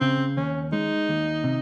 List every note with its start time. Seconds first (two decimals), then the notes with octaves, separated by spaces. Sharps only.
0.01 C#3 C4
0.37 D#2 C#4
0.72 G#3 D#4
1.09 D#2
1.44 C3